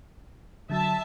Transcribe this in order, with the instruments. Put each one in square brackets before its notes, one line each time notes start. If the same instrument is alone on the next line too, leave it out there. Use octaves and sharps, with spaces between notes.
[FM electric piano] D3 F#3 [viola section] E5 A5